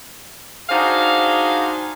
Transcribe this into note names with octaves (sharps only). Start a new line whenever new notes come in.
D4 D#4 F#4 G#4 C5 F5